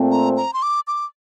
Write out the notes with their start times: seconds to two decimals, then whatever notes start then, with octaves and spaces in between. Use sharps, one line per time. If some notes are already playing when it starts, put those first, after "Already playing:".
Already playing: A#2 A3 C4
0.11 A#5
0.37 A#5
0.53 C6
0.63 D6
0.87 D6